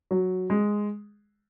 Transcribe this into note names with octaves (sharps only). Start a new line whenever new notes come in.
F#3
G#3